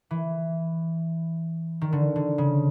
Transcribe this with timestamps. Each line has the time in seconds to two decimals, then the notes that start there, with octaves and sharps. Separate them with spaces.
0.11 E3
1.81 D#3
1.93 D3
2.16 D3
2.38 C#3